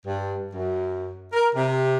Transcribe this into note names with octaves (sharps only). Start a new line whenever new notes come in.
G2
F#2
A#4
C3